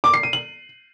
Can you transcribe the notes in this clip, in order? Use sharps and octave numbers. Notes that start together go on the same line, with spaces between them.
D6
C7
D#7
F#7